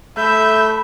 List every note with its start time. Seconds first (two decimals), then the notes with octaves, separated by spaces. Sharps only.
0.18 A3 E5 B5 G6